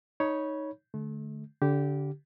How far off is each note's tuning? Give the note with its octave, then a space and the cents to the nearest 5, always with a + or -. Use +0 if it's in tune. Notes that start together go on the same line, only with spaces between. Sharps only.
D#4 +0 C#5 +0 B5 -20
D3 +0 A3 -35
D3 -30 G4 -15